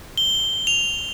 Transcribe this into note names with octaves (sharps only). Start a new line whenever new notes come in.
G7
F7